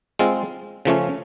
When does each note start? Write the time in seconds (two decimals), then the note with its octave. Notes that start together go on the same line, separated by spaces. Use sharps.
0.19 G#3 C4 F4
0.85 C#3 F3 A3 C#4